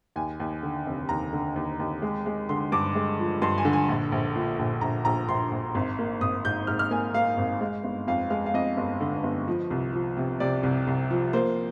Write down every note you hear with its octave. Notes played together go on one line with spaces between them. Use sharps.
D#2 G#5
D#2
D3
F1
D#2 A#5
D3
D#2
D#2
G#3
G#3
D3 C6
G2 D6
G#3
F3
G2 C6
G#5
D3
G#5
A#1
A#1
A#2
A#1
A#1 A#5
A#1 A#5
A#1 C6
A#1
G#1
A#3
G#1 D#6
G#2 G6
G#2 F6
F6
A#3 G#5
A#3 F5
G#1
G#3
G1
F2 F5
G#3 F5
F5
F2 D#5
G1
D3
G1
F3
C2
F3
C3
C3 D5
C2
C2
F3
A#3 C5